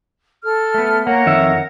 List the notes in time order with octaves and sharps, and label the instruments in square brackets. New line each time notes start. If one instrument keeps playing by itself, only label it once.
[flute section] A4 F6
[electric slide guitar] A3 B3
[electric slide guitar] A#3 [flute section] A#4 C#5 F#5
[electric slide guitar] F2 D#3 E5